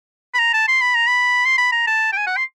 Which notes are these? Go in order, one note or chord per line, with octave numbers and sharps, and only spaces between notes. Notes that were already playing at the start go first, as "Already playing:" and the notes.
B5
A#5
A5
C6
B5
A#5
B5
C6
B5
A#5
A5
G5
G#5
F#5
C6